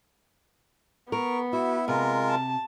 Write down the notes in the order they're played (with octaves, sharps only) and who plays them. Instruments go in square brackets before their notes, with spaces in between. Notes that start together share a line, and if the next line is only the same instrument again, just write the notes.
[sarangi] B3 [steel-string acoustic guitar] A#4 [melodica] C#6
[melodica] E4 E5 [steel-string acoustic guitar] F#4
[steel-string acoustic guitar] C3 [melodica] G#3 F4 A#4
[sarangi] A5